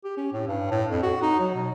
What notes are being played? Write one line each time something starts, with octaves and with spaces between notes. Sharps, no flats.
G4
C#4
A2
G2
A2
F2
F#4
D#4
F#3
B2